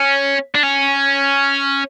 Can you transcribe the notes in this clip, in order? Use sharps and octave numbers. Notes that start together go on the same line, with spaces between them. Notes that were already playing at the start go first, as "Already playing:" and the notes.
Already playing: C#4
D4
C#4